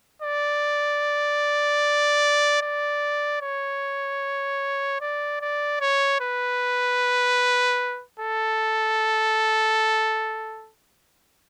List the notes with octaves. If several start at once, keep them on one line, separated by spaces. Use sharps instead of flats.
D5
D5
C#5
D5
D5
C#5
B4
A4